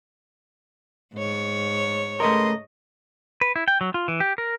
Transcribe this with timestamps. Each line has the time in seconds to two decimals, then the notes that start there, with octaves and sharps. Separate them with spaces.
1.14 G#2 C#5
2.20 C#3 A3 A#4 B4 D#5 C6
3.41 B4
3.56 E4
3.68 G5
3.81 F#3
3.94 F4
4.08 E3
4.20 G4
4.38 A#4